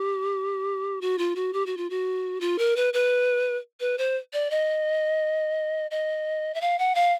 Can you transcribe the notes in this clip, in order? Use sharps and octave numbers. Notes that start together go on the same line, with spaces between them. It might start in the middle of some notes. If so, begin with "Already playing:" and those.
Already playing: G4
F#4
F4
F#4
G4
F#4
F4
F#4
F4
A#4
B4
B4
B4
C5
D5
D#5
D#5
E5
F5
F#5
F5